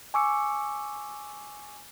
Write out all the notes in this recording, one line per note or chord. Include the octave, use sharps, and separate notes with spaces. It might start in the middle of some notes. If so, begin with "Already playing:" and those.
G#5 C#6 D6 E6 C#7